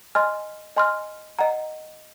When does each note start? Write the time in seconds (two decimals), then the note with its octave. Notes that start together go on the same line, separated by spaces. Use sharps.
0.15 D#5 G#5 C6 F6
0.77 D#5 G#5 C6 F6
1.39 D#5 F#5 A#5